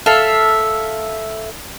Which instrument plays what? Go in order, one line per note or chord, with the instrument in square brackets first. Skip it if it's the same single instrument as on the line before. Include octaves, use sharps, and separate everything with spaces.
[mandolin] A4 E5 F5